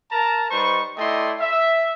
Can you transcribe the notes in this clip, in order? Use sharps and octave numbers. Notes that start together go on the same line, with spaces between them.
A#4 A5 A#5
G3 D#4 B4 C5 C#6
A3 E4 D5 D#5 G5 C6
E5